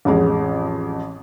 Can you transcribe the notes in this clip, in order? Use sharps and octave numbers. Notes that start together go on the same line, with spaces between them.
A1 F2 G#3